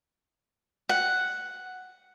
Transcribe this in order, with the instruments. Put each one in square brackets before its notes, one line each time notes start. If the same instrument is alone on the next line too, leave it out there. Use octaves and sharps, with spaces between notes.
[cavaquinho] F#5